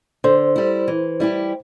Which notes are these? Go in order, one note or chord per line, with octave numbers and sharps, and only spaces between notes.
D3 C5
G3 E4
E3
G3 E4 G4